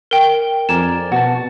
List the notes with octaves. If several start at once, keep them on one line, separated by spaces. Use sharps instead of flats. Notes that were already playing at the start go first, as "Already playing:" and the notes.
A#4 G5
F2 A#4 D5 G#5 E7
B2 F#4 A5